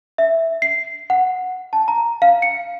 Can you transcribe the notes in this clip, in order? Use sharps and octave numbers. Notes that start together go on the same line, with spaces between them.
E5
C7
F#5
A5
A#5
F5
C#7